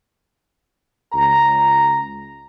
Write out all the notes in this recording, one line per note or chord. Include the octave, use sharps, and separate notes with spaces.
C#2 A#5